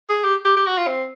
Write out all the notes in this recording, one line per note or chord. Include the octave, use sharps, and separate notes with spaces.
G#4
G4
G4
G4
F#4
F4
C4